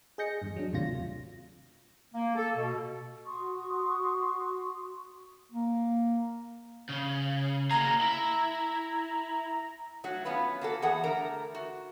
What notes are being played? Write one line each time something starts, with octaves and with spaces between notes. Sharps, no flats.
G#4 D#5 G6 A#6 C#7
E2 G2
F#3 D4
G#1 D#2 C3 A3 F4 A#6
A#3
A4
B2
F#4 C6 C#6 D#6
A#3
C#3
A#3 G#4 A#5
E4
F#3 A3 F#4
B3 C#4 F4 B4
A#3 F#4 A4
E2 G#4 F#5
D3 A3 A#4 A#5
F#4